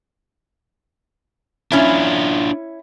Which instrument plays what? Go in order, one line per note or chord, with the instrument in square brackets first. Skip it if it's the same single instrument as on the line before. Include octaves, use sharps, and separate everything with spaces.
[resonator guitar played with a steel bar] C#4 E4 [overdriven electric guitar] D4 F4